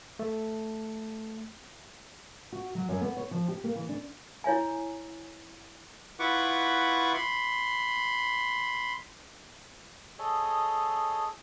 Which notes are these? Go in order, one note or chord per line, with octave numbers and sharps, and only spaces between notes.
A3
F#4
F#3
F#2
B3
C#5
F3
G4
A#3
E3
D4
E4 C#5 E5 G#5
E4 F4 B4 F#5 C#6 D6
B5 C6
G#4 A4 C#5 D#5